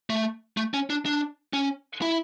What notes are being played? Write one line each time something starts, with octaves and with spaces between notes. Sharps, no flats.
A3
A3
C#4
D4
D4
C#4
E4